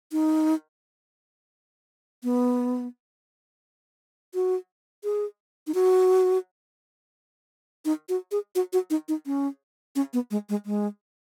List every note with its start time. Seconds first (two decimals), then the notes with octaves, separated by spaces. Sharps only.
0.12 D#4
2.24 B3
4.34 F#4
5.04 G#4
5.67 D#4
5.75 F#4
7.85 D#4
8.09 F#4
8.32 G#4
8.55 F#4
8.73 F#4
8.90 D#4
9.08 D#4
9.26 C#4
9.96 C#4
10.13 B3
10.31 G#3
10.49 G#3
10.66 G#3